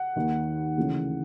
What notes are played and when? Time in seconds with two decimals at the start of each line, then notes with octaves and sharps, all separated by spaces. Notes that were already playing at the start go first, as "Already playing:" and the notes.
Already playing: F#5
0.16 D#2 D#3
0.77 D2 C#3 E3